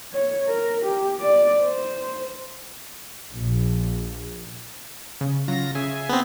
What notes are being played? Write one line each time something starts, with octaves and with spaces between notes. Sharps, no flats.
C#5
A#4
G4
D5
C5
A#1
C#3
C#3 F#3 F4 A#6
C#3 G#4 E5 G#5
B3 C4